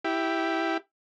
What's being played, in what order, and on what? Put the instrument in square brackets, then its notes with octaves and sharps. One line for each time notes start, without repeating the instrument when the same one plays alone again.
[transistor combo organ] E4 G4